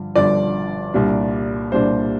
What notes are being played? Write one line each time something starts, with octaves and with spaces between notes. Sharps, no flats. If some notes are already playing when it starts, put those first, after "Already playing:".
Already playing: G2 D3 F3
G1 G2 D3 F3 D5
C2 A#2 G3 D4
C2 A#2 G3 D4 C5